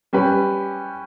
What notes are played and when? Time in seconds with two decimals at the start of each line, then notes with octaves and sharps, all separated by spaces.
0.13 G3 C#4 G4 B4